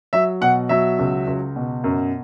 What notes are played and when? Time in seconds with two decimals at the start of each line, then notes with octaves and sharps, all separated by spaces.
0.13 F#3 E5
0.41 B2 F#5
0.69 F#3 E5
0.99 C#2
1.27 C#2
1.56 B2
1.84 F#2